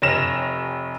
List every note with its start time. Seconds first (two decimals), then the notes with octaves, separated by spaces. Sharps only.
0.02 F1 C#5 A#6 E7 F7